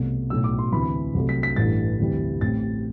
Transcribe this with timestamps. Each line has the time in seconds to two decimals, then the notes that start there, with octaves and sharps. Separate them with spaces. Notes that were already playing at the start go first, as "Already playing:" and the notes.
Already playing: C2 B2 A3
0.30 B1 A2 F#3 E6
0.44 D6
0.59 C6
0.72 D2 C3 E3 B5
1.15 C2 C3 F#3 A3
1.29 B6
1.43 B6
1.56 A1 G2 E3 A3 A6
1.99 D2 C3 E3 G3
2.41 A1 A2 G3 C4 A6